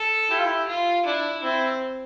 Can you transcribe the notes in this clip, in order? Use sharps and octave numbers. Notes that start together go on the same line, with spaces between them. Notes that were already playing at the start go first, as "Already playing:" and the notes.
Already playing: A4
E4 G4
F4
E4
F4
D4 E4
C4 E4